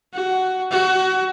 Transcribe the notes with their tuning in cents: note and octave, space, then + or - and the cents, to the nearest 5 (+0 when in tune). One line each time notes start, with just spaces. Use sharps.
F#4 +10
F#4 +25